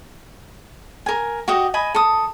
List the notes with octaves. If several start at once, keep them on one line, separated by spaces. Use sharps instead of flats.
A#4 G#5
F#4 G4 D#5 F#5
D#5 G#5 B5
A4 D#6